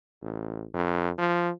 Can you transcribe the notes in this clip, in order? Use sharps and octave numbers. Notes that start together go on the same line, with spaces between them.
A1
F2
F3